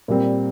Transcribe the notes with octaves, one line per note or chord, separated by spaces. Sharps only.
A#2 G3 C4